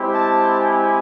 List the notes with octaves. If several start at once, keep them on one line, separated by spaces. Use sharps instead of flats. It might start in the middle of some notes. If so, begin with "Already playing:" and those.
Already playing: G#3 C4 E4 G4
A5
G#5